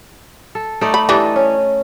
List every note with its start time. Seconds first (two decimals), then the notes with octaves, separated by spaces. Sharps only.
0.55 A4
0.81 A3 D#4 D5
0.94 B5
1.09 E3 G3 D4 A4 D#5
1.36 C#4